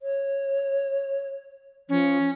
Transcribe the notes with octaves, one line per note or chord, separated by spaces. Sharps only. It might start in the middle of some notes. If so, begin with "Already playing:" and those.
C#5
F3 C#4